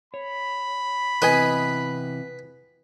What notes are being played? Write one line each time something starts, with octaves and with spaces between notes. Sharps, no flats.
C#5 B5
C3 E3 B3 B4 D#5 G#5